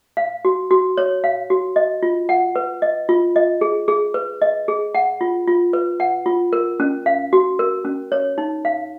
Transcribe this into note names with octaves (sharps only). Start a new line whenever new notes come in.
F5
F#4
F#4
C#5
F5
F#4
D#5
F4
F#5
B4
D#5
F4
D#5
G#4
G#4
B4
D#5
G#4
F#5
F4
F4
B4
F#5
F4
A#4
C#4
F5
F#4
A#4
C#4
C#5
D#4
F5